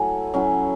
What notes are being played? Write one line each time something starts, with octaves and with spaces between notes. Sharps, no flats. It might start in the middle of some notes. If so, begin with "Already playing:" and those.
Already playing: F#3 A3 E4 F#5 G#5
F#3 C#4 E4